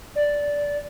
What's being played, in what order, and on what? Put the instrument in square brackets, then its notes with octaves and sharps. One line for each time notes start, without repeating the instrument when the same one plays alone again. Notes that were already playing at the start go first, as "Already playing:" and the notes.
[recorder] D5